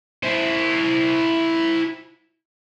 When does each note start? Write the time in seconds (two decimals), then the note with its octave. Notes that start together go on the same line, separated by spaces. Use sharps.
0.23 E4 C5